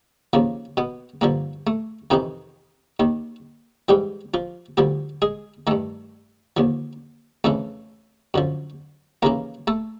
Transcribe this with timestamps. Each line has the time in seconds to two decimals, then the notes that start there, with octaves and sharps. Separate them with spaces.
0.33 D#2 C#3 F3 A#3
0.77 B2 B3
1.21 G2 D3 F3 A#3
1.67 A3
2.10 F2 C3 D#3 E3 D#4
3.00 D#2 D#3
3.89 G#2 E3 G3 G4
4.34 F3 F4
4.77 D2 D3 F3 G3 G4
5.22 G#3 G#4
5.67 G2 D#3 A3 A4
6.57 D#2 D3 F3
7.44 F2 C#3 E3 A3 A4
8.34 F#2 D3 F3
9.22 D#2 C#3 E3 A#3 A#4
9.67 A3 A4